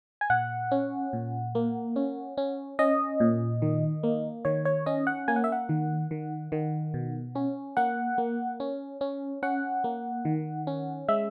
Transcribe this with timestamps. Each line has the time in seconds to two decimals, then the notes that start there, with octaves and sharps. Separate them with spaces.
0.21 G#5
0.30 A#2 F#5
0.71 C#4
1.13 A#2
1.55 A#3
1.96 C#4
2.37 C#4
2.79 C#4 D#5
3.20 A#2
3.62 D#3
4.03 A#3
4.45 D#3 C#5
4.65 C#5
4.86 C#4 D#5
5.07 F#5
5.28 A#3 G#5
5.36 F#5
5.44 E5
5.52 F#5
5.69 D#3
6.11 D#3
6.52 D#3
6.94 B2
7.35 C#4
7.77 A#3 F#5
8.18 A#3
8.60 C#4
9.01 C#4
9.43 C#4 F#5
9.84 A#3
10.25 D#3
10.67 C#4
11.08 G#3 E5